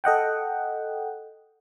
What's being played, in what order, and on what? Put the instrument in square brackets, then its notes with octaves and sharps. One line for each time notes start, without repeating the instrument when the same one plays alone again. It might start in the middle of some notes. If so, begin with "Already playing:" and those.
[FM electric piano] A4 D#5 F#5 G5